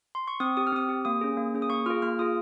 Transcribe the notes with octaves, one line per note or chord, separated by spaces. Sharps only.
C6
C#6
C4 D#6
G4 D#6
F6
C4 D#6
G4
A#3 D#6
C#4 G#4
A#3
C#4 G#4
D#6
A#3 C#6
F4 G#4 F6
A#3 F6
F4 G#4 D#6